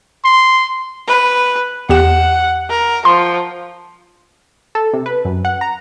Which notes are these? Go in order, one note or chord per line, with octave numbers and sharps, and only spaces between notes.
C6
B4
E2 G4 F#5 E7
A#4
F3 C6
A4
C3
B4
F#2
F#5
A#5